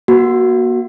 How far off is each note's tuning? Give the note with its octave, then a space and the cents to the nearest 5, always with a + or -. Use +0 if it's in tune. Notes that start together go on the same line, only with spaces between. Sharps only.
A#3 +40 F#4 +0